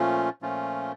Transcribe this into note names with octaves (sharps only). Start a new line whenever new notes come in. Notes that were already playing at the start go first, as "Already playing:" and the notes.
Already playing: A#2 F3 A3 C#4 F4
A#2 F3 A3 C#4 F4